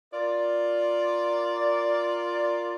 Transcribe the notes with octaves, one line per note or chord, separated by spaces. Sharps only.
F4 A#4 D5